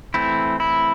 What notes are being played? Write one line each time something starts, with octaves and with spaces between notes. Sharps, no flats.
E3 A3 C4 E4
E4